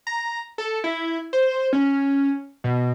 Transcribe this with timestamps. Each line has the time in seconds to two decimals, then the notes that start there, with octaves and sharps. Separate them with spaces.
0.07 A#5
0.58 A4
0.84 E4
1.33 C5
1.73 C#4
2.64 B2